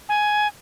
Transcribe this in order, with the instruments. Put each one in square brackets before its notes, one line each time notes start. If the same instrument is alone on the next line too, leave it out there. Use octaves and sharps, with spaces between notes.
[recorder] G#5